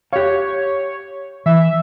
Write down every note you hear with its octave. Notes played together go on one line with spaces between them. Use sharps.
G4 C#5 F5
E3 E5